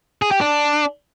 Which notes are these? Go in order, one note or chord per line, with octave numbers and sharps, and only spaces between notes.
G#4
G4
D4